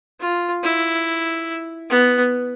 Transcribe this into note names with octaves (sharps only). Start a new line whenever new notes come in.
F4
E4
B3